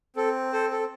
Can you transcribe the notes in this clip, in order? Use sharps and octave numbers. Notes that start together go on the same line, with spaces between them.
C4 A4
A4 C5
A4